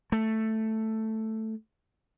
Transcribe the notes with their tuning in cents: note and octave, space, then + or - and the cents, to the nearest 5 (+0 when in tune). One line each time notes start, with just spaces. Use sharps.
A3 +5